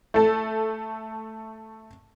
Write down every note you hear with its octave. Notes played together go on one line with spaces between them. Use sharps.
A3 A4